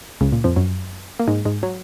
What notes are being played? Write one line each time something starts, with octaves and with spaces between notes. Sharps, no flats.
C#2 C#3
A#2
F2 F3
F#2 F#3
A#3
G#2 G#3
G#2 G#3
F#3